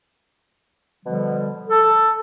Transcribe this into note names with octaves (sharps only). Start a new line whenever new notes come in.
B2 D3 F3 G3
A4